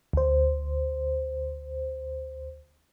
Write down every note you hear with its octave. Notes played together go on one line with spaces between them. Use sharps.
D2 C5